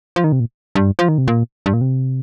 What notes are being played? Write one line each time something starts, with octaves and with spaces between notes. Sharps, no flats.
F3
D#3
C3
A#2
G2
F3
D#3
C3
A#2
G2
A#2
C3